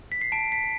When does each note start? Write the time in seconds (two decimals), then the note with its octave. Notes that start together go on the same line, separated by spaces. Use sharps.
0.12 B6
0.21 C7
0.32 A5 D7
0.52 B6